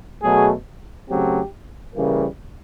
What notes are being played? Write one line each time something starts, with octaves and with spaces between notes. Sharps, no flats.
B2 F#3 A3 G#4
C#3 F#3 A3 C4 G4
C#3 E3 G3 A#3